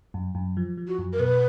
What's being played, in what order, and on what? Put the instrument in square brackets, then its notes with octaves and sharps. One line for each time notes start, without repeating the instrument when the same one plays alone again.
[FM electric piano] F#2
F#2
F3
F3
[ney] F#4
[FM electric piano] F#2
[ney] A#4
[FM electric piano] B2 [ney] B4